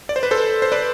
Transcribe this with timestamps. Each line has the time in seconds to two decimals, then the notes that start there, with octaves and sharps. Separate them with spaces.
0.09 D5
0.16 C5
0.23 B4
0.31 A4 C5
0.62 C5
0.72 B4 D5